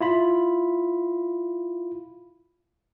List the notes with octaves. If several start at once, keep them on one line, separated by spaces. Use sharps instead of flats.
E4 F4 B5